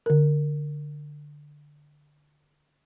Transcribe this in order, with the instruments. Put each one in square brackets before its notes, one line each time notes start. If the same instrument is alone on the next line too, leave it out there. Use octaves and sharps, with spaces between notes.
[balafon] D3 A#4